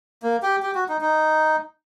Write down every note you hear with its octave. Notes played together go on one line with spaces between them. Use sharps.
A#3
G4
G4
F#4
D#4
D#4